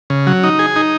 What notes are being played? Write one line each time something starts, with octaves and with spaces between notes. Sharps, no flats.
C#3
F#3
D#4
G#4
D#4